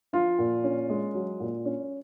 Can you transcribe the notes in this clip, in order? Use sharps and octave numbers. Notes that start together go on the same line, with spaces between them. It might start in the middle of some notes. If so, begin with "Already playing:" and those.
F3 F4
A#2
C#4
G#3
F#3
A#2
C#4